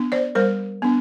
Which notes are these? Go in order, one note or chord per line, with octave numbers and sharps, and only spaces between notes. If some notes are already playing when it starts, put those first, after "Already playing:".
Already playing: B3 D4
C5 D5
G3 A#4 C5
B3 D4